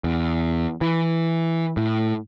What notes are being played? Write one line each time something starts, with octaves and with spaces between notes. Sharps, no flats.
E2
E3
A2